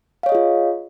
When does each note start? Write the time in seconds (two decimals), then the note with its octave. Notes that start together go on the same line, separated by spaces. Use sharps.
0.23 F5
0.26 C#5
0.29 D#5
0.32 G#4
0.35 F4